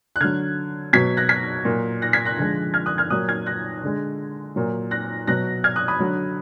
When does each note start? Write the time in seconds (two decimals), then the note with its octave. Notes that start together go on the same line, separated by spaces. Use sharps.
0.16 F#6
0.21 D3 F#3 F6 G#6
0.93 B2 F#3 G#6 B6
1.17 F#6 A#6
1.29 G#6 B6
1.65 A#2 F#3
2.02 F#6 A#6
2.13 G#6 B6
2.25 F#6 A#6
2.38 D3 F3 G#3
2.74 F6 G#6
2.86 D#6 F#6
2.98 F6 G#6
3.10 A#2 F#3 D#6 F#6
3.28 F6 G#6
3.46 F#6 A#6
3.83 D3 G#3
4.56 A#2 F#3
4.91 F#6 A#6
5.27 B2 F#3 F#6 A#6
5.64 F6 G#6
5.76 D#6 F#6
5.88 B5 D#6
6.00 D3 F#3